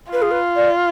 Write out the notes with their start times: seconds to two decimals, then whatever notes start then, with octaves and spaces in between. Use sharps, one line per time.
0.13 F4 B4
0.22 G#4
0.31 B4
0.56 D5